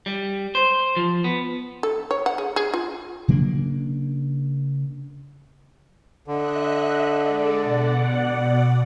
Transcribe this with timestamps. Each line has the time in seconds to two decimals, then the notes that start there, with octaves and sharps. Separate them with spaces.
0.06 G3
0.55 C5
0.96 F3
1.24 B3
1.83 A4
2.11 C#5
2.26 F#5
2.38 G#4
2.56 G#4
2.74 F4
3.28 C#3 F#3 A#3 D4
6.28 D3 D#5 E5 F#6
7.19 G#3 A4 D5
7.62 B2 D5 F#5